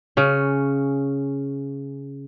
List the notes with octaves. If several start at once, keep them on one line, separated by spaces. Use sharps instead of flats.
C#3 C#4